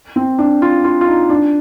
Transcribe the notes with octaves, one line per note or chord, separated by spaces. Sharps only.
C4
D4
F4
F4
F4
D#4
D4